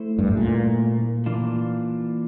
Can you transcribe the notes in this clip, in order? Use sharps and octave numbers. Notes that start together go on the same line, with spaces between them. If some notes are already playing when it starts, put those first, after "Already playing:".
Already playing: A3 E4 A4 C5
G2
A2
A#2
E3 A#3 D4 F4